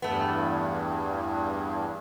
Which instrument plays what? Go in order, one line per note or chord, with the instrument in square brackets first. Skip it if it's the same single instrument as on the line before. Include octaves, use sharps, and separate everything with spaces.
[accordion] E2 G2 [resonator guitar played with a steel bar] A3 B3